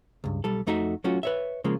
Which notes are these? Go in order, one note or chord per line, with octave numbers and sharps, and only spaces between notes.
C#2 G2
B1 G3 A4
F2 A3 D#4 F#4 A#4 E5
F#3 A3 C#4 F4 F#4
B4 C#5 E5
C#3 F3 G#3 A#3